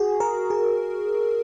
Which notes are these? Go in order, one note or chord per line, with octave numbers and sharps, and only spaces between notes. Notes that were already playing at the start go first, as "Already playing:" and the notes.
Already playing: F#4 G#4
A#4
G#4